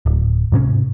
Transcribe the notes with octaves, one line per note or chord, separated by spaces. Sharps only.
D1
G#2 C3 C#4